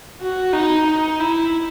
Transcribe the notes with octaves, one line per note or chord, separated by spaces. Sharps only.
F#4
D#4
D#4
E4